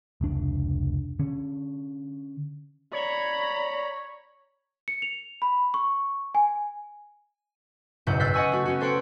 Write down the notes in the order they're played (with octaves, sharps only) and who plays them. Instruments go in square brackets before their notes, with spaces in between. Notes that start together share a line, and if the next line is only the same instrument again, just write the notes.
[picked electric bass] F1 C#2 D4
D3 C#4
[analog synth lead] C#5 [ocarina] D5 [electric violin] A#5 B5
[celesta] C#7
F7
B5
C#6
G#5
[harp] F#1 B1 G#2 E4 F#5 G6
E6 F#6 G6 A6 B6 C7
D#5 F#5 G#5 C#6 E6
A3 F#4
B3 C#4 F#4
A4 C5 C#5 F#5 G5